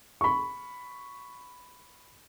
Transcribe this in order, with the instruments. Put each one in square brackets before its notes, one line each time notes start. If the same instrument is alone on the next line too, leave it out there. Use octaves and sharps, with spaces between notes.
[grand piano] B5 C#6